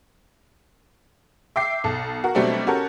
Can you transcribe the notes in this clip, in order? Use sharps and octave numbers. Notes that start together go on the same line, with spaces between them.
E5 G5 D6 C7
B1 A4
F#4 A#4
B2 F#3 G3 A3 C4 D4
C#4 F#4 G4 A4 A#4